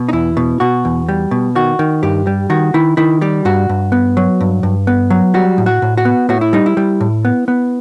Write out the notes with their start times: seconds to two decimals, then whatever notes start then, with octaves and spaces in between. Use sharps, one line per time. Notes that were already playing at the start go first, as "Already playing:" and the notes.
Already playing: B2
0.09 D#4
0.13 E2 E4
0.37 B2
0.60 B2 F#4
0.85 E2
1.09 G3
1.31 B2
1.55 D#3 F#4
1.79 D#3
2.03 G2 G4
2.27 G3
2.50 D#3 F#4
2.74 D#3 E4
2.97 D#3 E4
3.21 G3 G4
3.45 G2 F#4
3.69 G2
3.92 B3
4.17 F#3
4.41 G2
4.63 G2
4.87 B3
5.10 F#3
5.34 G3 F#4
5.58 A2
5.66 F#4
5.82 A2
5.97 F#4
6.05 B3
6.29 A2 F#4
6.41 E4
6.53 G3 D#4
6.66 E4
6.77 G3
7.01 A2
7.25 B3
7.48 B3